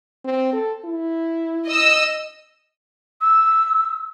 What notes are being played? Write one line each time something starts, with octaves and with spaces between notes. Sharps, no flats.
C4
A4
E4
D#5 E6
E6